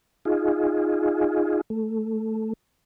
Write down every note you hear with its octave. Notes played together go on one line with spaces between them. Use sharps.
D#4 F4 G#4
A3